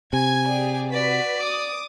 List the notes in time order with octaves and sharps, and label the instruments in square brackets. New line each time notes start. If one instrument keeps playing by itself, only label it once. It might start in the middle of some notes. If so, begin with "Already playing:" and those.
[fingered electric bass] C3 [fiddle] G#5 [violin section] G#6
[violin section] G4 G#4 D5
[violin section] F#4 B4 B6 [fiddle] D5
[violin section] D6 D#6